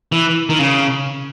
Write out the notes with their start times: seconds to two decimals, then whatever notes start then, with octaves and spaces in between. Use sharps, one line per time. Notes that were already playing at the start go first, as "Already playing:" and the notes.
0.12 E3
0.49 D#3
0.59 C#3